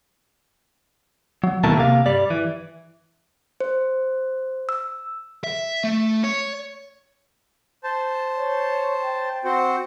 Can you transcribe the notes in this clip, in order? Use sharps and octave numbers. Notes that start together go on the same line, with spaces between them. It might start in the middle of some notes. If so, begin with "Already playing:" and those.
F#3
D#2 B2 A3 E4 A#4 A5
C3 A#3 F5
G2 G3 D5
E3
C5
E6
E5
A3
C#5
C5 A5
C#5
G5
C4 F#4 C5